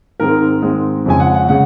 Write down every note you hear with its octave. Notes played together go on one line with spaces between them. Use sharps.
G#2 D#3 G#3 C4 A#4
G#2 D#3 G#3 C4
F2 C#3 G#3 G#5
F#5
F#5
C#3 G#3 F#5